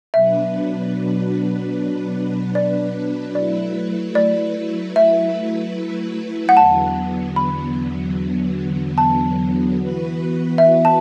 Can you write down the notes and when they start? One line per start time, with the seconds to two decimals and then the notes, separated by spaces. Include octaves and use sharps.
0.14 B2 F#3 D4 B4 E5
2.55 D5
3.35 F#3 A3 E4 B4 D5
4.15 D5
4.96 E5
6.49 F#5
6.56 E2 D3 F#3 B3 A5
7.36 B5
8.98 A5
9.78 E3 B3 F#4 B4
10.58 E5
10.85 A5